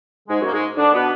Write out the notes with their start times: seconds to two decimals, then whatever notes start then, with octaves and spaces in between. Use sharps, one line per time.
0.28 G#2 G#3
0.40 F#2 F#3
0.47 A#3
0.52 G#2 G#3
0.77 D3 D4
0.93 B2 B3